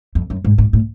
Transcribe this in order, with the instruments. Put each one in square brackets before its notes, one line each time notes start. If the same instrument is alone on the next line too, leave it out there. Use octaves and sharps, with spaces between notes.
[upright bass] F2
F#2
G#2
G#2
A2